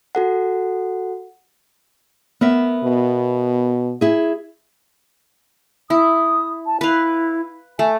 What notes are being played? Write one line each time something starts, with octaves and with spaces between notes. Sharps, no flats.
F#4 A4 F#5
B3 A#4 E5
B2
E4 G#4
E4 D#6
A5
E4 B4 F5
A3 G#5